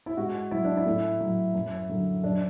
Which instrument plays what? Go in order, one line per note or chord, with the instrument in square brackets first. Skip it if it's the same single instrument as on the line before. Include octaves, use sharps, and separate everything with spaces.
[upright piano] E4
G#2 F#4
F#3 E4
D4
E4
A2
F#3
F#2
D3 F#3
F#2 D4